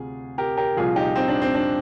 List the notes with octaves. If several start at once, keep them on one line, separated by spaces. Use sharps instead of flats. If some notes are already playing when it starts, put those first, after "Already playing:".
Already playing: D2 C3 F4 G#4
G4 A#4
G4 A#4
C2 A#2 F3 F4 G#4
D#4 G4
C4 D#4
D4
C4
D4